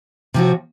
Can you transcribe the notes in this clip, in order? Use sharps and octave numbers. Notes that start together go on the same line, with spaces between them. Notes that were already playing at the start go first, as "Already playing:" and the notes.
C3 F3 C4 F#4